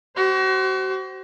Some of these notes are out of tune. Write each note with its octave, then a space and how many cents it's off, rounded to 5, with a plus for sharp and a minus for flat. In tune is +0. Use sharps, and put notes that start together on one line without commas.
F#4 +35 C5 +0